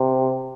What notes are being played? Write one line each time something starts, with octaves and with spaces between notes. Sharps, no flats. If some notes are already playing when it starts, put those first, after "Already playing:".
Already playing: C3